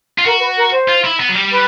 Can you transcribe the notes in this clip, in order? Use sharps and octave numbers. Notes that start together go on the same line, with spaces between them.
F4
F#4 A#4
B4
A#4
C5
F4
E4
B3
F#3
G3
B4